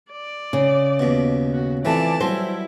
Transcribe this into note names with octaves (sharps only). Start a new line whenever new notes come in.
D5
C#3
D#2 B2
F#4
C3 E3 F3 A3 D5 A5
F#3 G3 E4 C5